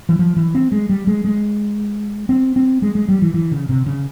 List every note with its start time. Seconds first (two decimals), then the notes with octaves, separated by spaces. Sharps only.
0.09 E3
0.19 F3
0.37 E3
0.55 C4
0.72 G#3
0.89 G3
1.07 G#3
1.25 G#3
2.29 C4
2.56 C4
2.82 G#3
2.95 G#3
3.08 G3
3.22 E3
3.34 E3
3.51 C#3
3.69 C3
3.86 C#3